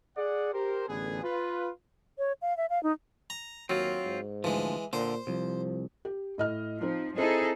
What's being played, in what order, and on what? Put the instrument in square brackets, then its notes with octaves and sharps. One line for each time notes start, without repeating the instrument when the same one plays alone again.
[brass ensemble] G#4 D5 F#5
G4 A#4 C5
A1 D3 B3 G#4
F4 B4
[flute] C#5
F5
E5
F5
D#4
[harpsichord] A#5
[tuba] D#2 [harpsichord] F#3 [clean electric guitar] C4 F4
[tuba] G#2
[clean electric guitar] D2 F3 [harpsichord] E3 G#3
[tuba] A#2 [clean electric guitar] D3 [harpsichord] C5
[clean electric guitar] C2 [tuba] F3
[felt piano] G4
A2 D#5 F6
[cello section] F3 [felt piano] C4 D#4
[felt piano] C4 E4 [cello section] D#4 G#4 A4